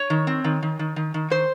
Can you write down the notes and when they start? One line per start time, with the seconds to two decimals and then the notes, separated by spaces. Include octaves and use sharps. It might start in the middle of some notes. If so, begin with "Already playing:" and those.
Already playing: C#5
0.10 D#3
0.27 C4
0.44 D#3
0.63 D#3
0.79 D#3
0.96 D#3
1.14 D#3
1.30 D#3 C5